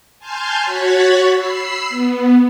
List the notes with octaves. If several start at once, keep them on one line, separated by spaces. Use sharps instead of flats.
G#5 A5 C6 F6 G6
F#4 C#5 F#6 G#6 A6 B6
B5 E6 C7
B3